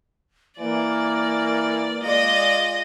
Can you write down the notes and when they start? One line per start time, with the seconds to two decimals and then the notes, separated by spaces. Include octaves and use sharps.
0.59 E3 A#3 D5
2.03 G#3 F4 D5 D#5